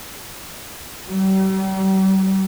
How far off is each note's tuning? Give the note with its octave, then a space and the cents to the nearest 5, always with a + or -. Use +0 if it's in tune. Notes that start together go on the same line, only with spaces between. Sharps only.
G3 -40